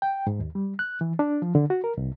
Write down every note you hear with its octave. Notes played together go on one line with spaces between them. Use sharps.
G5
G#2
D#2
G3
F#6
E3
D4
F3
D3
F#4
A#4
C2